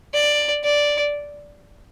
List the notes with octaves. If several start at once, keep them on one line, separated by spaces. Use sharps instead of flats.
D5
D5